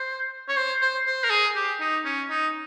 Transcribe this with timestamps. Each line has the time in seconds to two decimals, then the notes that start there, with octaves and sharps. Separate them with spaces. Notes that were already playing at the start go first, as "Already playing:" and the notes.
Already playing: C5
0.48 C#5
0.56 C5
0.81 C5
1.06 C5
1.24 A#4
1.30 G#4
1.55 G4
1.80 D#4
2.05 C#4
2.30 D#4